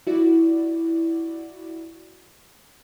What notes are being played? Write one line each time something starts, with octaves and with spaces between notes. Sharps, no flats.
E4 F#4 D5